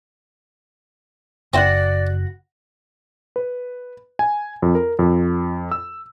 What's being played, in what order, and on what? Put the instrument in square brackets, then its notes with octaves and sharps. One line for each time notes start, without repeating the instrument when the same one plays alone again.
[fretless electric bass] F#1 [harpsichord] C4 E4 C5 [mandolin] F#4 F#5 [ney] D5
[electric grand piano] B4
G#5
F2
A#4
F2
E6